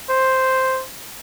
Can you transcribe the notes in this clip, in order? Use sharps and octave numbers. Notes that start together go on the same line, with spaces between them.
C5